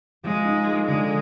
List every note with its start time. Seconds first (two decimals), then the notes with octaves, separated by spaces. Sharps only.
0.23 F3 G#3
0.45 D#4
0.66 A#3
0.87 D3 G#3